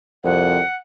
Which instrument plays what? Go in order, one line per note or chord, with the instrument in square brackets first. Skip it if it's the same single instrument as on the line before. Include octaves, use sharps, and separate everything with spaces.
[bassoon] C2 [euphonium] F2 [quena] F#5